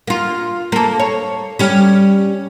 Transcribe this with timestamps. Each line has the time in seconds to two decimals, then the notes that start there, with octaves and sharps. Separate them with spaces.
0.07 A#3 F4
0.72 A#3 A4
0.99 C#5
1.59 G3 C#4